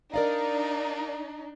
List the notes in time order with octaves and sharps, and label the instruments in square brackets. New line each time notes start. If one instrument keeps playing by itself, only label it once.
[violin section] D4 D#4 [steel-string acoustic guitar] A#4 D5 F5